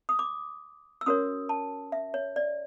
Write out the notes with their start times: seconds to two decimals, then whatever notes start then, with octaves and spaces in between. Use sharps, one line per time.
0.09 D#6
0.19 D6
1.01 E6
1.06 C#4 F#4 A#4 C#5 D#6
1.49 A5
1.92 E5
2.14 C#5
2.36 D5